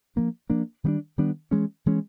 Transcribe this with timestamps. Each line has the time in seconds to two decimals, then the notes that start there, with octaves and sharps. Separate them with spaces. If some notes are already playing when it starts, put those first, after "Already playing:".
0.16 F3 A#3 D4
0.50 F3 A#3 D4
0.84 D#3 G3 B3 D4
1.18 D#3 G3 B3 D4
1.51 E3 G#3 C#4
1.86 E3 G#3 C#4